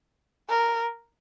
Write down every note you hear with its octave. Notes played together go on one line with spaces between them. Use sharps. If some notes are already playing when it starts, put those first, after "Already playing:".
A#4